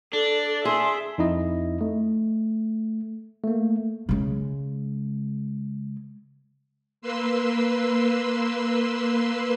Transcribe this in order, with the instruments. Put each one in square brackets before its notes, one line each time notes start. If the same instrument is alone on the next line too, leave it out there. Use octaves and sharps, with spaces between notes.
[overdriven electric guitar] D4 [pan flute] A4 [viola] D5
[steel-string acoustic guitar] G#4 [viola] E5 [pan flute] C6
[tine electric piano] F2 D#4 E4 D#5
A3
A3 A#3
[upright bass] C#3 G#3
[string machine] A#3 B4 C6 E6